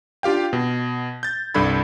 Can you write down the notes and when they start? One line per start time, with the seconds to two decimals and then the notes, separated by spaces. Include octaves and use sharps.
0.23 D4 F4 G4 F5 G5
0.53 B2
1.23 G6 A6
1.54 C2 G2 D4 A4 B5 G#6